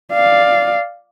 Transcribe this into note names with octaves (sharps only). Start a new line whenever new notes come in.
D5 F5